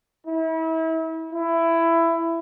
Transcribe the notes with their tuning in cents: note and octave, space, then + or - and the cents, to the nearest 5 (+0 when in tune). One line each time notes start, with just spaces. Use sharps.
E4 -35
E4 +15